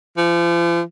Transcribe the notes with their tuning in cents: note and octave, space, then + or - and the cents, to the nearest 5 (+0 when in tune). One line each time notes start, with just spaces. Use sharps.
F3 -40